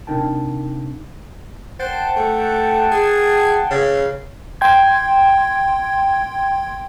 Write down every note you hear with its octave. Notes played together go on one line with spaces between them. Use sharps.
C3 D4 D#4 A#4 G5 A5
C5 F#5 G5 A5
A3
G#4
C#3
G5 C6 G#6